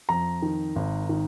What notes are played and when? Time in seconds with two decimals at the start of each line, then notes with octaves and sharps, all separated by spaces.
0.09 F2 A#5
0.42 D#3
0.76 G#1
1.09 D#3